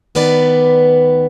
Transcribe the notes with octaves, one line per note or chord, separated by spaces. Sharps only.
D2 D#3 B3 B4 D5